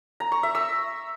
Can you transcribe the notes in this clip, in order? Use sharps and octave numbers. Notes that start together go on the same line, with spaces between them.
A#5
C#6
E5
E6